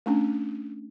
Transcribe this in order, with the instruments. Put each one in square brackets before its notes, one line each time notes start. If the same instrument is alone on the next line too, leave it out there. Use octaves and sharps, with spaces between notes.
[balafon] A3 C#4 D4